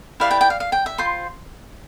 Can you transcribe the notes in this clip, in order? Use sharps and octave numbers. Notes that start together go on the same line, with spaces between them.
E4 G4 B4 D5 F5
G5
G5
F5
F5
G5
E5
F4 C5 C6